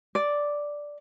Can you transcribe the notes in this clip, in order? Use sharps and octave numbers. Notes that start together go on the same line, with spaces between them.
D5